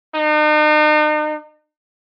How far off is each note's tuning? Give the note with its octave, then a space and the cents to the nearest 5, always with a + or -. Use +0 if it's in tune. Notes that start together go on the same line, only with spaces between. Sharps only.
D#4 -40